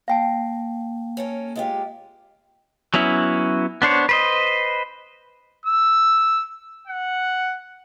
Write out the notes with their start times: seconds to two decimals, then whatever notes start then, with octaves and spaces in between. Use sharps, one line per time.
0.08 A#3 F5 G5 A5
1.17 C#4 A4 A#4
1.56 G#3 F4 G4
2.94 F#3 B3 C#4 E4
3.82 B3 D4 C5 C#5
4.09 B4 C5 D#5
5.65 E6
6.87 F#5